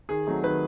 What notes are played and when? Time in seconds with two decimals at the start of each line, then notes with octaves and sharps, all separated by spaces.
0.09 D#3 G#4
0.27 F#3 A3 C4 D#4
0.44 D#3 B4